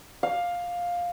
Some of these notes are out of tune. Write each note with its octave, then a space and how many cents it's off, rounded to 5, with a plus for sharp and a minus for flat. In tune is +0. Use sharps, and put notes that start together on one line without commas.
F5 +10